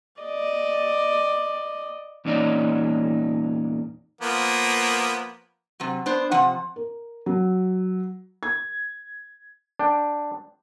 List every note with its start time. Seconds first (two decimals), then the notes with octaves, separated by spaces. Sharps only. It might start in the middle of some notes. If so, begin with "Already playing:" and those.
0.21 D5 D#5
2.25 E2 A#2 C#4 D#4 D5
4.21 F3 A#3 B3
5.80 C3 F#3
6.06 B3 D4 C5
6.31 C3 F3 F#5
6.76 A#4
7.26 F#3
8.43 G#6
9.79 D4 G5